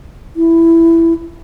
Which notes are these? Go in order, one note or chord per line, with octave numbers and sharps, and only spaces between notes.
E4